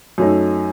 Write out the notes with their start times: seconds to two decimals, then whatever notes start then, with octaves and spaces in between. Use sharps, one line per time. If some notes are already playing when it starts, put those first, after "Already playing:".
0.18 F#2 F#3 A3 D#4